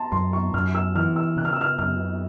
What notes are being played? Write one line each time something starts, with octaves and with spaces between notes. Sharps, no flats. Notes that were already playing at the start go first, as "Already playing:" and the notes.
Already playing: A5 A#5 C6
F#2 C6
C#6
F#2 F6
E6
E3 F6
E6
C#3 F#6
F6
E6
F6
F#2 F6